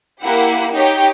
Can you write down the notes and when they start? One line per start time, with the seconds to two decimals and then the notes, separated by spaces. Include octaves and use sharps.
0.21 A#3 E4 G4 F#5
0.73 D#4 G4 C#5 G5